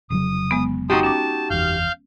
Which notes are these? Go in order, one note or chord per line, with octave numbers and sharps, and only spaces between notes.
F1 C#3 F#3 D#6
G#3 B3
D#4 F#4 G4 A5 C6 D#6
C#4 A5 D6
F#1 E2 F5 F6 G6